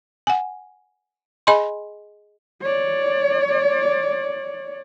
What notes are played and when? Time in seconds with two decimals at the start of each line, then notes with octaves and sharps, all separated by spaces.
0.27 F#5 G#5
1.47 G#4 D#5 G#5 B5 C6
2.62 C#5 D5